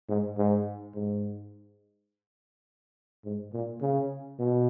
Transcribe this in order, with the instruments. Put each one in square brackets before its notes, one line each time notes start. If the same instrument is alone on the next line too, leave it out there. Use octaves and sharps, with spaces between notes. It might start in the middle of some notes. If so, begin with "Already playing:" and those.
[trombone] G#2
G#2
G#2
G#2
A#2
C#3
B2